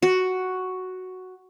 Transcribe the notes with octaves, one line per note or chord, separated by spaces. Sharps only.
F#4